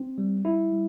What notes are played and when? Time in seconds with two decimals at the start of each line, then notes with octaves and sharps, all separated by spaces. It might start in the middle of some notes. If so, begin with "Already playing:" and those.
Already playing: C4
0.18 G3
0.45 G3 E4
0.72 G3